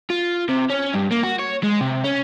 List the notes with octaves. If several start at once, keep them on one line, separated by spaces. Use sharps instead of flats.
F4
C3
C#4
G2
A#3
F#4
C#5
G#3
C3
C#4